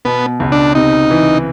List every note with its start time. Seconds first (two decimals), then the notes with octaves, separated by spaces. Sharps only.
0.05 B2 B3
0.40 C#2
0.52 D4
0.75 C3 D#4
1.10 E3